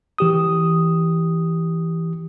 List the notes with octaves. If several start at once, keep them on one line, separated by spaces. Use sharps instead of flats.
E3 G4 D#6